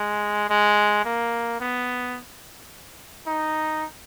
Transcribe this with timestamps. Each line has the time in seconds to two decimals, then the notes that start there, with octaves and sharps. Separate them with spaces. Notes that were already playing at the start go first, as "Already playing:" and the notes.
Already playing: G#3
0.50 G#3
1.05 A#3
1.60 B3
3.27 D#4